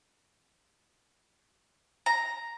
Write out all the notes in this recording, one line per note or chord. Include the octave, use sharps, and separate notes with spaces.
A#5